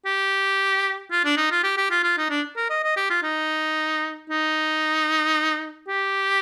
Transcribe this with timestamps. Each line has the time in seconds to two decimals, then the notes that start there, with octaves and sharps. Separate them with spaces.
0.05 G4
1.11 F4
1.24 D4
1.37 D#4
1.51 F4
1.63 G4
1.77 G4
1.91 F4
2.03 F4
2.18 D#4
2.30 D4
2.56 A#4
2.70 D#5
2.84 D#5
2.96 G4
3.10 F4
3.23 D#4
4.30 D#4
5.88 G4